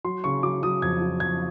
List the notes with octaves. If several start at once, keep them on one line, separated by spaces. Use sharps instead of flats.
F#3 C6
C#3 C#6
F#3 D6
F#3 D#6
F2 G#6
F#3
F2 G#6